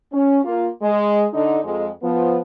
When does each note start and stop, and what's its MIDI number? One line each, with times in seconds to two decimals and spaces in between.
0.12 0.39 61
0.44 0.69 58
0.44 0.69 65
0.81 1.26 56
1.33 1.59 50
1.33 1.59 63
1.64 1.88 41
1.64 1.88 56
2.03 2.39 53
2.03 2.39 59